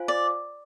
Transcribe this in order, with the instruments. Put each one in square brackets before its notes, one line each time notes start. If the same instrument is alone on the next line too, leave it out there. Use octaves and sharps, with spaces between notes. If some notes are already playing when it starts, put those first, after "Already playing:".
Already playing: [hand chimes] F4 C5 F5 G#5
[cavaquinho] D5